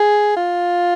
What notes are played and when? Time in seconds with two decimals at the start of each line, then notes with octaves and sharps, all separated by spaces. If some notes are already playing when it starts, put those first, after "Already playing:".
Already playing: G#4
0.37 F4